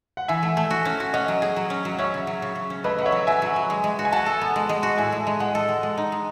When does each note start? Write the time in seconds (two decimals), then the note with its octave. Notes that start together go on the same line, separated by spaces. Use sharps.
0.17 F#5
0.28 E3 E5 G#5
0.43 A3
0.57 A3
0.71 F#4
0.85 C#4
1.00 F#4
1.13 C#4 D#5 F#5
1.28 F#3
1.42 G#4
1.56 F#3
1.70 C#4
1.85 F#3
1.93 F#5
1.98 C#4 C#5 E5
2.14 C#3
2.27 F#3
2.42 C#3
2.55 C#3
2.70 C#4
2.84 A3 B4 D#5
2.99 F#3 F#5
3.06 C#5 E5
3.12 F#3
3.27 F#3 E5 G#5
3.42 F#3
3.56 F#3
3.70 G#3
3.84 G#3
3.99 F#4
4.05 G#5
4.12 F#4 F#5 A5
4.26 A4
4.41 B3
4.56 G#3
4.69 G#3
4.83 F#4
4.97 A2 E5 G#5
5.12 G#3
5.27 G#3
5.40 G#3 D#5 F#5
5.55 A4
5.69 G#3
5.83 G#3
5.97 D#4
6.12 G#3